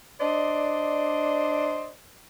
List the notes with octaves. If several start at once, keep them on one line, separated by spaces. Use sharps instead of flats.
D4 C5 D5 D#5